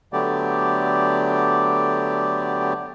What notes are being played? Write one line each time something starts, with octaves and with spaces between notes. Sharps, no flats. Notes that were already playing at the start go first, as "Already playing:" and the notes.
D3 F#3 A3 B3 G4 D5